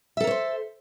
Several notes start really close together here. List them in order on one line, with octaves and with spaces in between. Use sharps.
E5 A4 A#4 C#5 C5